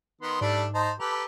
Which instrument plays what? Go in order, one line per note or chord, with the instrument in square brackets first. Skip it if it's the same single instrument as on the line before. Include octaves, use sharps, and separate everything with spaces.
[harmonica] D#3 B3 C6
[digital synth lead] G#2 [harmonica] G3 A3 D4
[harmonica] D#4 C5 A5
[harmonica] G4 A4 B4 [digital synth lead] A#5